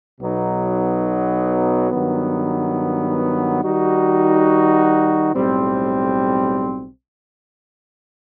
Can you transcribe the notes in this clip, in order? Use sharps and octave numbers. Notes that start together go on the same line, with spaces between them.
B1 B2 F#3 B3 D#4
G2 D#3 F#3 B3
D#3 G3 D#4 F#4
B1 A2 G3 C4